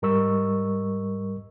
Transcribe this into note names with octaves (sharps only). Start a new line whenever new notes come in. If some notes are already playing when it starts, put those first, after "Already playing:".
G#2 G3 A#4 D#5 C#6 E6